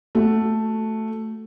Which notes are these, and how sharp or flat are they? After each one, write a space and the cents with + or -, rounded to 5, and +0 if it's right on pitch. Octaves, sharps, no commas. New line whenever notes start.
A3 +0 F#4 +0